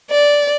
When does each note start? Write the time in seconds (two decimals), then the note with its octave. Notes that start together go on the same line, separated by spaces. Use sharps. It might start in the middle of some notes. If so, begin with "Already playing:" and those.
0.11 D5